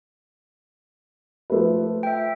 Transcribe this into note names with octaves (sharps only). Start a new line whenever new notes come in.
F3 A3 B4
E5 G5